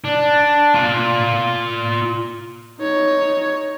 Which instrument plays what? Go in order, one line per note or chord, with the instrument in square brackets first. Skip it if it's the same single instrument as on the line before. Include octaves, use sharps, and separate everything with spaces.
[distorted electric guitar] D4
F4 D5
[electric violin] D#4 C#5